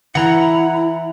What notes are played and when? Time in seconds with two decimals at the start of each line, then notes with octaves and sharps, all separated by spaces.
0.15 E3 E4 F#5 A#5